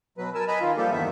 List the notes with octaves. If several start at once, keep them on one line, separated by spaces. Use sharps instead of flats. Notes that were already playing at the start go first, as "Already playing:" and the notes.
B2 F#3 B4
A#4 G#5 A5 E6
B4 D#5 G#5 A#5 B5
D#3 F4
F3 G3 A#3 G4 A4
E2 G2 D#3 B3 E5